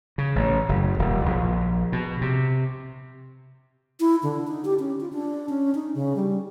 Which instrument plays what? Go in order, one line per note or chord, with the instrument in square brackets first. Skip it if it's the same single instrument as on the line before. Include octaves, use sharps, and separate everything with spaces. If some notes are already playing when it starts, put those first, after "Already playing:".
[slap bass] C#3
A1
F#1
D#1
A#1
B2
C3
[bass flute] E4
D3
D#4
G4
C#4
F4
D4
C#4
D#4
C#3
G3